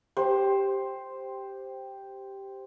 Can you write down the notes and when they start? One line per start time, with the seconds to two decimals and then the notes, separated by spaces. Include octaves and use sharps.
0.17 G4 C5